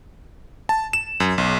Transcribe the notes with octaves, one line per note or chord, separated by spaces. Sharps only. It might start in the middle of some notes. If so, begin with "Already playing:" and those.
A5
E7
F#2
B1